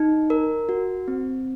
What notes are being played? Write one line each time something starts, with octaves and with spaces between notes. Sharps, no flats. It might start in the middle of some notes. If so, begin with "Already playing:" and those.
Already playing: D#4
A#4
F#4
C4